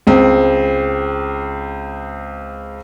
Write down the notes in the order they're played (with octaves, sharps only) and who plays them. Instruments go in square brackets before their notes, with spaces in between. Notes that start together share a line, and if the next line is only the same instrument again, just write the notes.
[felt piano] C#2 C4